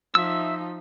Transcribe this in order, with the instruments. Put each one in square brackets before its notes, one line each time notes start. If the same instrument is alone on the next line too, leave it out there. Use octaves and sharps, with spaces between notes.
[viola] F3 D#4 [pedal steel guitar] E5 E6